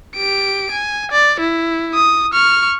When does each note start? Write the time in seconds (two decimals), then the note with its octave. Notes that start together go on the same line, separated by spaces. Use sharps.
0.16 G4 D7
0.71 G#5
1.11 D5
1.40 E4
1.94 D#6
2.33 C#6 F6